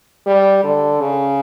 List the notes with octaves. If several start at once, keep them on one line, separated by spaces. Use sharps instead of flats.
G3
D3
C#3